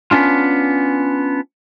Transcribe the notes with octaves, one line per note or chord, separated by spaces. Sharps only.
B3 C#4 D4 F4